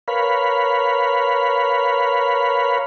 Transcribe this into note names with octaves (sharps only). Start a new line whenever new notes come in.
A#4 B4 C#5 F5 B5